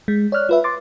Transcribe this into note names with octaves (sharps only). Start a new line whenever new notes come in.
G#3
C#5 D5 F6 F#6
F4 B4 E5
C6 D6 A6